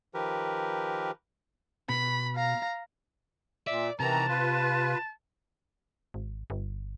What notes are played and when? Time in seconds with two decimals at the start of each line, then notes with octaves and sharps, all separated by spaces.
0.14 D#3 F3 G4 A#4 B4
1.89 B2 B5
2.36 F5 A#5
3.67 A#2 D5 E5
4.00 C3 D#3 E3 A5 A#5
4.28 F4 B4
6.14 G#1
6.50 G1